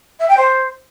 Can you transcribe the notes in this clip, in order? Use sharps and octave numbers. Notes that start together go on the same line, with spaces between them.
E5
G5
C5